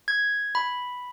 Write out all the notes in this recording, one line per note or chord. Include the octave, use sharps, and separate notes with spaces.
G#6
B5